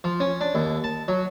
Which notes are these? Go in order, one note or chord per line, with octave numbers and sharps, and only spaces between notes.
F3
C#4
D4
D#2
A5
F#3